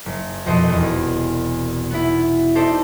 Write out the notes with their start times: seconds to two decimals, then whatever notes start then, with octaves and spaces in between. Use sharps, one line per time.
0.06 F#1
0.46 C2 F2 B2 C5 D#5
0.69 E1 E2
1.91 B3 E4
2.55 D#4 A4 C5 D5 E5